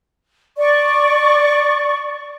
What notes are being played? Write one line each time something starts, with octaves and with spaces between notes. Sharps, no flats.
D5 C#6